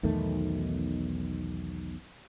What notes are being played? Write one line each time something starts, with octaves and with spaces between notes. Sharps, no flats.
B1 E2 D#3 A3